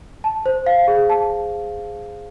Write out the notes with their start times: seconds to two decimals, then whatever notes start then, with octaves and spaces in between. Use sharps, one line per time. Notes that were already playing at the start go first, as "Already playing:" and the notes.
0.24 A5
0.46 C5
0.66 F5
0.88 G#4
1.09 A5